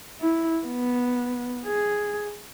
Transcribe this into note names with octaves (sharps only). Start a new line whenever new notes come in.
E4
B3
G#4